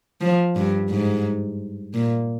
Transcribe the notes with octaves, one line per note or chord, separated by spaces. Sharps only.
F3
G2
G#2
A#2